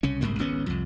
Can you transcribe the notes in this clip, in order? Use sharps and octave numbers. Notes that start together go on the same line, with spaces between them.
C2 C#3 C#4
F#1 C2 G#2 A#3
G#1 C#2 B3 C#4
C2 F2